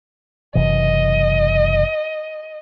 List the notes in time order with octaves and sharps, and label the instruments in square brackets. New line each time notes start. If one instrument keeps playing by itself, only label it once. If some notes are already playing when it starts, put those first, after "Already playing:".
[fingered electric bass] F#1 C3 E3 [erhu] D#5